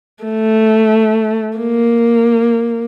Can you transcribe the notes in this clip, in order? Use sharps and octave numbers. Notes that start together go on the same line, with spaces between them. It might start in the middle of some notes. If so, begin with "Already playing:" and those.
A3
A#3